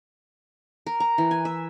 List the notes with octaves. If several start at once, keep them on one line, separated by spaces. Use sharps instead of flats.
A#4
A#5
E3
G#5
E5